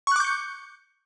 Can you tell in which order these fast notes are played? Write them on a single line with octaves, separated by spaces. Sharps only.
C#6 F#6 D6 G6 C#7